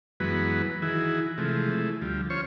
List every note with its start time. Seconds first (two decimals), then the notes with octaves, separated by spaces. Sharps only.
0.20 F#2 E3 F#3 G#3 B3 B4
0.82 D#3 E3 E4 F#4 G#4
1.38 C3 E3 F3 G#3 A3
1.70 G#3 A3 E4
2.02 D2 F3 G3
2.30 C#4 F4 C5 C#5 C#6